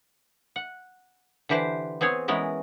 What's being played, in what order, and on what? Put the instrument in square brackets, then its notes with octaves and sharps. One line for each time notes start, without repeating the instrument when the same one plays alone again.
[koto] F#5
D3 E3 G4 B4 C5
B3 C4 G#4 C#5
E3 G#3 B3 C#4 A#4